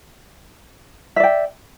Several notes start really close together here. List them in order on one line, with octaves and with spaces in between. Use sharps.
E5 D5 G5